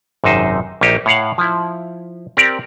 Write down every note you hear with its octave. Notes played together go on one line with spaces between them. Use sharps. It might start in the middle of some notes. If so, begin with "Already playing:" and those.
G#1 F#2 C3 D#4 C5
A#1 A#3 D#4 G4
A2 C#5 F5 F#5
F3 E4
C4 G4 A#4 D5